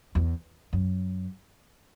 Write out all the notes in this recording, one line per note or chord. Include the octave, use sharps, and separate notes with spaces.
E2
F#2